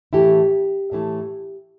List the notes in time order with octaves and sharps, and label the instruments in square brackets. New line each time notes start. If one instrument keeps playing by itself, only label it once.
[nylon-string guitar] A2 E3 A3 E4 G4
A2 E3 A3 E4